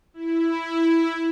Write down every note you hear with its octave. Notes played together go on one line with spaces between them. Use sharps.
E4